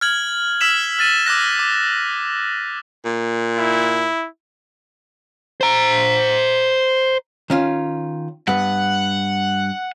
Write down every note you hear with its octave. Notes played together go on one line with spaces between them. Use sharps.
F6 G#6 F#7
E6 F6 B6 E7 F#7
F6 A6 D#7 F#7
D6 E6 F#6 A#6
D6
A#2
E4
C5 A#5
D#3 C#4 F4
G2 B3 F#5